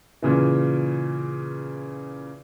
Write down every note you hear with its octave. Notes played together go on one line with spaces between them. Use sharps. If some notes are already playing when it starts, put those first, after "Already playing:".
A#2 C#3 E3